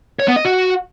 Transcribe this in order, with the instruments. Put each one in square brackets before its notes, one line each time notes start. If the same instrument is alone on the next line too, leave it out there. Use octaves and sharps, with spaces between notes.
[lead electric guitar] C#5
B3
D#5
F#4